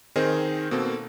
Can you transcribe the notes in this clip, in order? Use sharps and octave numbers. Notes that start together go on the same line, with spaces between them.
D#3 C4 D#4 G#4 A#4 C5
B2 A#3 C4 A4